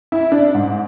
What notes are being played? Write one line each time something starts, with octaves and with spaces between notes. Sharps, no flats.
E4
D4
G#2